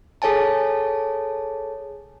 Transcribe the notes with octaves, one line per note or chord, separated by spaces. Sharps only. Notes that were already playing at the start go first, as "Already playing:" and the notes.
G#4 A4 C#5 G#5 A5